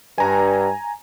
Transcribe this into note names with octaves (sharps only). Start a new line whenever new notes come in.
G2 G#5 A#5